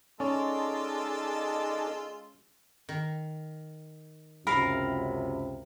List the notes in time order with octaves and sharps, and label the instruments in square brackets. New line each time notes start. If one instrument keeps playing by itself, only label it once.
[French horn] G#3 [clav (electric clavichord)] C#4 [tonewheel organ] D#4 A4 D5 [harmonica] F4 A5 E6
[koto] D#3
[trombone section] C#2 F#2 C3 [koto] A#4 F5 [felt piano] B5